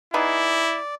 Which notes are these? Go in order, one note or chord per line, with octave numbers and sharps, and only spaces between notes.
B3 D#4 E4 G#4 D5